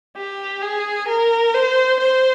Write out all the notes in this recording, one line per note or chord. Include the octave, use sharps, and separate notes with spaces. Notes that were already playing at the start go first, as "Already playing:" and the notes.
G4
G#4
A#4
C5
C5